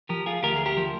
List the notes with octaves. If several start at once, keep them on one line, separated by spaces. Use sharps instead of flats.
F3 G4 A#4
F4 G#4
D2 G4 A#4
G#4
G4 A#4
F3